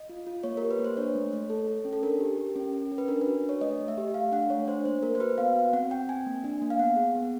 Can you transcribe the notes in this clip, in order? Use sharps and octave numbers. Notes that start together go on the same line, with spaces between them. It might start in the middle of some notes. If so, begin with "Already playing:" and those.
Already playing: D#5
F4
F4
A#3 C#5
G4 A#4
B4
A#3
C5
D4 C#5
A3
A3
A4
A4
C#4
A4
D4 A#4
G4
G4
C#4
C#4
C#4
B4
D4 A#4
B4
F#4
D4
C#5
A3 D#5
A3
E5
G4
A3 F5
D4 F#5
A3 C#5
D4 C5
A#3 C5
A#3 A#4
C5
F#4 B4
B3 F5
F#4
C4 F#5
C4 G5
C4 G#5
A#3
D4
A#3
F5
B3 F#5
G#4
B3